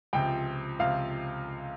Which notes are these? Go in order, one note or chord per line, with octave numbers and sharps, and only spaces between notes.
C#2 C3 F3 G5
C#2 C3 F3 F5